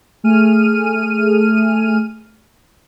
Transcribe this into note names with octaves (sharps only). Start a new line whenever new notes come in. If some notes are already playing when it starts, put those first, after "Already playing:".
A3 G#4 F6 D#7